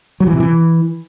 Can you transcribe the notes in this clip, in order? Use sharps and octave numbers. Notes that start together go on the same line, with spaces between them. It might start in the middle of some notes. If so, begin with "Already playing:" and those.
F#3
E3
C3
E3